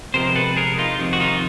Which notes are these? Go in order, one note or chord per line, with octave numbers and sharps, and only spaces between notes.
C3 F3 G#3 B3 A#4 C5
A4 B4
G#4 A#4
D#4 F4
F2 C3 D#3
F#4
D#4 F4